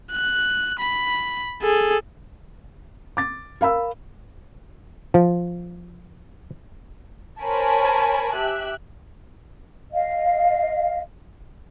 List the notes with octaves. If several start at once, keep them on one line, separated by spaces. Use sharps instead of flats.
F#6
B5
G#4 A4
D6 A6
A#4 F5 B5 E6
F3
A#4 C5 C#5 G#5 A5 B5
G4 E5 F#6
D#5 F5